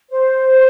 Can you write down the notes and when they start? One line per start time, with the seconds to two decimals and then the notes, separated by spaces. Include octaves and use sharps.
0.10 C5